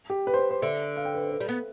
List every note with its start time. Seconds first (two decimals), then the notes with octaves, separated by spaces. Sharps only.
0.10 G4
0.27 B4
0.34 C5
0.39 B4
0.51 C5
0.62 D3 E5
0.96 F5
1.05 G5
1.15 B4
1.23 C5
1.31 B4
1.40 G3
1.49 B3